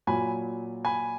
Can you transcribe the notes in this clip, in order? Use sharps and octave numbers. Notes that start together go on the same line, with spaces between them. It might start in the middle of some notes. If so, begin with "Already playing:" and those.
A#2 F#3 G#5 B5
G#5 B5